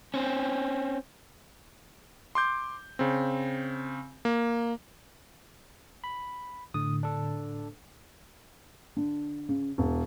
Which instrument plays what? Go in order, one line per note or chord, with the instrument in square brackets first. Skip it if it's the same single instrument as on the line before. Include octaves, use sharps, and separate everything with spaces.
[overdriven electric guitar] C4 C#4
[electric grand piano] C6 D6 G6
C#3 C4
A#3
[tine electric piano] B5
[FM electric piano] A2 D3 [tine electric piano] D#6
[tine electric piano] D4 A4
[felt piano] D3
C#3
E1